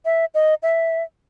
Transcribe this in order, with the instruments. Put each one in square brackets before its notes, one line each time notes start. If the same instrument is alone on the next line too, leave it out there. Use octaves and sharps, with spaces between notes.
[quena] E5
D#5
E5